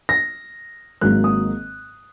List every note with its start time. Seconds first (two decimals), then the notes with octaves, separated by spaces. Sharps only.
0.09 A#6
1.01 G#1 G#2 F#3 A#3 F#6
1.24 D#6